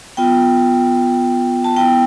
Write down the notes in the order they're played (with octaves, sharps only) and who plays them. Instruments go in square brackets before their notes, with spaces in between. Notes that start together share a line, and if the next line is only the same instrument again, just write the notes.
[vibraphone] B3 F4 G5
A5
B3 E4 G5